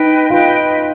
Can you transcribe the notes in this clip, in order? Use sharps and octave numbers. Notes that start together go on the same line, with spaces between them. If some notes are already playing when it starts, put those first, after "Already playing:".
Already playing: D#4 B4 D#5 G5
F4 B4 D#5 G5